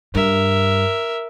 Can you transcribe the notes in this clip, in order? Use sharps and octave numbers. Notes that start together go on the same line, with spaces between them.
G2 A#4 E5